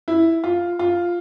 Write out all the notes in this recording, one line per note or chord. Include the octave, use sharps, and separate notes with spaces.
E4
F4
F4